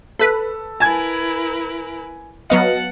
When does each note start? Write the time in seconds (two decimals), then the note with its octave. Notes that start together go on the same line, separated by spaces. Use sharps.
0.19 A4 B4 B5
0.80 E4 A#4 B4 G#5 A5 G#6
2.50 F#3 B3 D#5 F5 F#5 A5